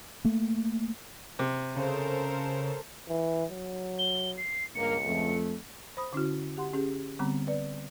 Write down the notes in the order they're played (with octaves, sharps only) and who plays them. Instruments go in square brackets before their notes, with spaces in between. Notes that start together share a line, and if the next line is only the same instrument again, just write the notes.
[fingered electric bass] A3 A#3
[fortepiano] C3
[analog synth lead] C#3 [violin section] A4 A#4 C5
[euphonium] E3
F#3
[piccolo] G7
C7
[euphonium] C#2 [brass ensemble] G2 A#3 [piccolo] C#7
[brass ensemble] F2 A3
[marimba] C5 B5 D#6
D3 C#4 E4 F#4
G4 F#5 C6
C#4 G4 G#4
D3 G3 B3 C4
B4 D5